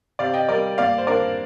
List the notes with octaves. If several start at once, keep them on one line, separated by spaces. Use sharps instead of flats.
C3 D5 F5
D#5 G5
G3 A#4 D5
A#3 D5 F5
C5
D4 A#4 D5